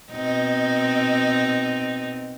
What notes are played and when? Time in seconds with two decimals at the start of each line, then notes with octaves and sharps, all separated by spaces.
0.12 B2 C4 D#4